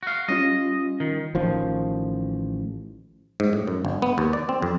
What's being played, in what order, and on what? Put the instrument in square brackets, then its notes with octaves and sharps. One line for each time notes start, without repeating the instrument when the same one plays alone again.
[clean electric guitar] F#4 F5
[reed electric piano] G3 C#4 F4 [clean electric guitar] D#5
[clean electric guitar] D#3
[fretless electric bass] A1 D#3 F3
[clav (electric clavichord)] G#2
A2
F#2
G1
B3
D#2
D5
C4
F2